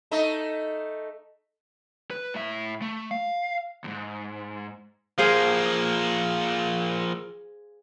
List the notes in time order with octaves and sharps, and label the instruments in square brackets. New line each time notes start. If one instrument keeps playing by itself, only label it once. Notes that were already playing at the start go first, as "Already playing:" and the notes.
[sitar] A3 D#4
[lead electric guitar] B4
A2 E5
A3
F5
D#2 G#2
[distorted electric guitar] F3 A#3 [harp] G#4 C5 F5